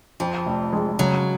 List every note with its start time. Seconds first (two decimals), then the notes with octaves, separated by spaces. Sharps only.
0.20 F2 F3
0.46 F1
0.73 G#3
0.99 C#3 F#3